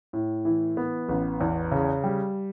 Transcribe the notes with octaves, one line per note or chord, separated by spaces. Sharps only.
A2
E3
B3
A1
E2
C#3
G3